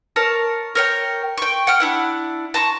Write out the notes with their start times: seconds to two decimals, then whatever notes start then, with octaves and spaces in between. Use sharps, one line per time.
0.16 A#4 C#5 A5
0.75 A#4 C#5 G5
1.38 G5 C#6
1.67 F#5 G5 F6
1.80 D4 E4 F#5
2.54 A5 A#5 C6 C#6